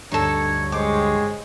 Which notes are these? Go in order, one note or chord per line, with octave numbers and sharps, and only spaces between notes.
D2 G2 D4 D#4 A4 C#5
G#3 G4 C5 C#5 D6